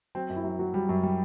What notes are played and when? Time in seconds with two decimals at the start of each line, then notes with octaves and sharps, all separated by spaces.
0.15 F#3 C4
0.29 F#2
0.36 E4
0.44 F#3
0.59 F#3 F#4
0.74 F#3 G3
0.89 F#2 F#3
1.03 G3